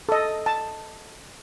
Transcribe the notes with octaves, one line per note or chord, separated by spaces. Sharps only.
A4 D#5
A5